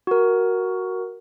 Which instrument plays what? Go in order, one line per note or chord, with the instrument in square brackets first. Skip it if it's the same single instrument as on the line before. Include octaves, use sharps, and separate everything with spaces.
[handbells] F#4 A#4